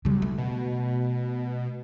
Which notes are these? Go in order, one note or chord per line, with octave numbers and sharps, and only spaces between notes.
B1 C#3 G3
A3
B2